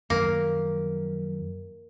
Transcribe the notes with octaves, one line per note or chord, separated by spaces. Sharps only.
F#2 D#3 F3 A#3